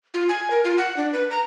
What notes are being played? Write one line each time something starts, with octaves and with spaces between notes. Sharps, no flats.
F4
G#5
A#4
F4
F#5
D4
B4
A#5